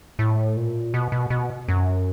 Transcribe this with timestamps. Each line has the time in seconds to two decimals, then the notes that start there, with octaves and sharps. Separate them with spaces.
0.19 A2
0.57 A#2
0.94 B2
1.12 B2
1.30 B2
1.68 F#2